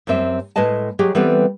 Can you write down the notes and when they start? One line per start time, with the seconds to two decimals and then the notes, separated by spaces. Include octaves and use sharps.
0.07 F#2 G3 C4 E5
0.56 A2 G#3 B4 D#5 A5
0.99 F#3 G#3 G4 G#4
1.15 E3 G3 B3 C4 A4